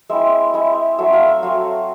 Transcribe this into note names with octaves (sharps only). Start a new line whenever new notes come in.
G#3 C4 E4 E5
G#3 C4 E4
F#3 A3 C4 E5
F5
E5
F#3 A3 C4 F5